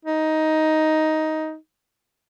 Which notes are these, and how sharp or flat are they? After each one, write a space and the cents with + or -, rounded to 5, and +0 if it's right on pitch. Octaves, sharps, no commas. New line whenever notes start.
D#4 +10